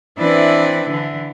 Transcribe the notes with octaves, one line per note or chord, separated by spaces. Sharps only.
E3 C4 D4 E4 B4 D5
D3 E3